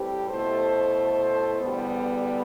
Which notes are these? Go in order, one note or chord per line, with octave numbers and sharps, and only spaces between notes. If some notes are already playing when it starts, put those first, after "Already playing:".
Already playing: A2 G3 C4 G4 B4
B2 A3 E4 A4 C5
E2 D3 G3 B3